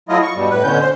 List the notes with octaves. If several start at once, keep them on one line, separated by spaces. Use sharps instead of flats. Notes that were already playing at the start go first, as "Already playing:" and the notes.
F#3 A3 E4 F4 D#5
C#6
G2 B2 G3
A2 B4
B2 D3 C#4 G6
C5